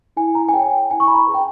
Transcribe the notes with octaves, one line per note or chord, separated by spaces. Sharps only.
E4 G#5
A#5
G#5
G#4 C#5 G5
E4 G#5
C#6
B5
A#5
G#4 B4
G5